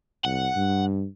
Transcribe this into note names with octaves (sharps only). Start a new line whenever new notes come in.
C2 F#5
G2